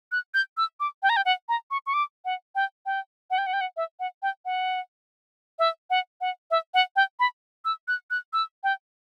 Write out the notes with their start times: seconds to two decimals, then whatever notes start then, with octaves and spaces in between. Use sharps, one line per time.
0.12 F#6
0.34 G6
0.57 E6
0.80 D6
1.03 G5
1.09 A#5
1.17 G5
1.25 F#5
1.49 A#5
1.71 C#6
1.87 C#6
1.94 D6
2.25 F#5
2.55 G5
2.86 G5
3.31 F#5
3.38 G5
3.46 F#5
3.53 G5
3.61 F#5
3.77 E5
4.00 F#5
4.22 G5
4.45 F#5
5.59 E5
5.90 F#5
6.21 F#5
6.51 E5
6.74 F#5
6.96 G5
7.20 B5
7.65 E6
7.88 F#6
8.11 F#6
8.33 E6
8.64 G5